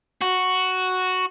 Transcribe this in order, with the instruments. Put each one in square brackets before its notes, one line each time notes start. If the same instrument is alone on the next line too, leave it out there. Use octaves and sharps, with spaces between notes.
[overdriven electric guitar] F#4